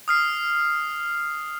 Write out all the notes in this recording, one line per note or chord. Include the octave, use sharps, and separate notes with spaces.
D#6 F6 C7